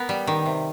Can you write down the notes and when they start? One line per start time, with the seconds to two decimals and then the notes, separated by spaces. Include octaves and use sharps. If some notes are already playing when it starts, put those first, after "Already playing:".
Already playing: B3 A#4
0.09 G3
0.27 D#3
0.46 C3